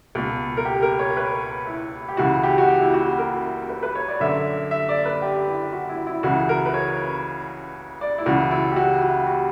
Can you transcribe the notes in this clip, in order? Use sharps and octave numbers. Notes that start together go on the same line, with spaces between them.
C#2 B2
A#4
G4
A#4
C#5
B4
E4
G4
C#2 C#3 E3 F#4
G4
F#4
G4
E4
F#4
F#4
A#4
B4
B4
C#5
D5
F#2 D3 E5
E5
D5
B4
G4
E4
F#4
E4
E4
C#2 C#3 E3 F#4
A#4
B4
C#5
D5
E4
C#2 C#3 E3 F#4
E4
G4
F#4
F#4
G4
F#4